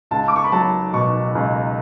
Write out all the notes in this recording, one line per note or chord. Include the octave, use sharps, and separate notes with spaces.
C#2 A5
D6
C#6
B5
F#3 A5
B2 C#6
C#2